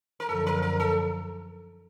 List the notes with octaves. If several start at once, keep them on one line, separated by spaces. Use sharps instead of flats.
A#4
F#2 D3 F3 A4
A#4
A#4
A4